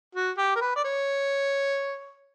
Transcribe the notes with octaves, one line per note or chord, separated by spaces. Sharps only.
F#4
G4
A#4
B4
D5
C#5